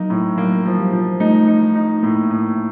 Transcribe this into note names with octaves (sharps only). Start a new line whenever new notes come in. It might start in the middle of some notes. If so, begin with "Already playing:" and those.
Already playing: F#3 A#3 D#4
A2
F#3 A#3
F3
G3
F3
A3 D#4
D#4
D#4
A2 A#3
A2